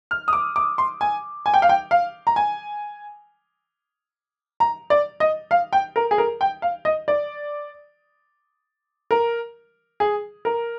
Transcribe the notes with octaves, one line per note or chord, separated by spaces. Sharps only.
F6
D#6
D6
D6
C6
G#5
G#5
G5
F5
G5
F5
A#5
G#5
A#5
D5
D#5
F5
G5
A#4
G#4
A#4
G5
F5
D#5
D5
A#4
G#4
A#4